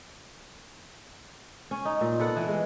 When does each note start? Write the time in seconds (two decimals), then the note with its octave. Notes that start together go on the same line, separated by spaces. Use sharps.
1.71 C#4
1.85 D#4
2.01 A#2
2.19 B3 A4 F#5
2.36 E3
2.48 G#3